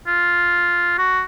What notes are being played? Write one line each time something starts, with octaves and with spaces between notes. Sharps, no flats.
F4
F#4